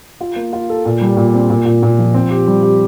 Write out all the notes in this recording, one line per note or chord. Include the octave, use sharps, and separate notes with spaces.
F4
A#3
F4
A4
A#2
G3
A#2
C4
A#2
A#2
A#2
F3
C4
G4
G3
G4